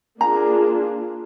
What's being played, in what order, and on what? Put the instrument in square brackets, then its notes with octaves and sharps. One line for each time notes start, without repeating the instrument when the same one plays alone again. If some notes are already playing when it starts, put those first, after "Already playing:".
[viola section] A#3 D4 F4 G#4 [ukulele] A#5